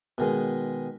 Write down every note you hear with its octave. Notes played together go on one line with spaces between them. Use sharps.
B2 D#3 G#3